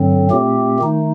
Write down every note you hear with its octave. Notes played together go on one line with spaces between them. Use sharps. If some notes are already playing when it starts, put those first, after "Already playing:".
Already playing: G2 D3 F#3 C4
A#2 A3 C4 G4
D#3 A3 D#4